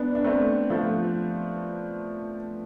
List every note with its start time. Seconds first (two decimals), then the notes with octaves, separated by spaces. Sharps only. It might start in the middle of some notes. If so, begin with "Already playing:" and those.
Already playing: B3 D4
0.15 D4
0.24 A3 C4
0.70 F3 A3